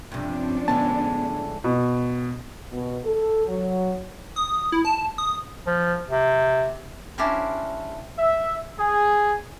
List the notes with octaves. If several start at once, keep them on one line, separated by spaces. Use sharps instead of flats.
G2 C3 F3 C#4 D4
A2 D3 G#3 B3 A5
B2
B2
A4
F#3
D#6
E4
A5
D#6
F3
C3
C#4 D4 E4 G4 A#4 C5
E5
G#4